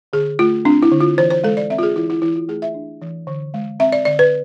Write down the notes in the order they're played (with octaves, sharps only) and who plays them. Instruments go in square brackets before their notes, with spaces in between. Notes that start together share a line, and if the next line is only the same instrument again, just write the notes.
[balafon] D3 G#4
A3 F4
C4 D4
E4
D3
F4
E3 C5
C5
G#3 A4
D5
C4 E5
F4
G#4
E3 E4
E4
E3 E4
F4
A3 G#4
E5
D4
E3
D3
G#3
C4 E5
D5
D3 D5
B4